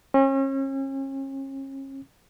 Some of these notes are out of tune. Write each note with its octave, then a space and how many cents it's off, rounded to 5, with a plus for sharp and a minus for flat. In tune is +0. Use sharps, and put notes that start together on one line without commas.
C#4 -35